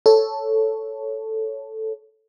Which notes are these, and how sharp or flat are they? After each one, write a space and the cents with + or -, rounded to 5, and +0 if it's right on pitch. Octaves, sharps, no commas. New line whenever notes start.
A4 +0 C#5 +0